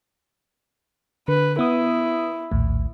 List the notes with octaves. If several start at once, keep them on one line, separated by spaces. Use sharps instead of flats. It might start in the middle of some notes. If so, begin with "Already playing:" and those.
D3 B4
B3 E4 D#6
A#1 D#2 A2